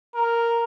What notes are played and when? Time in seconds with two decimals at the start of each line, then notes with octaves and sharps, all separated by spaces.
0.15 A#4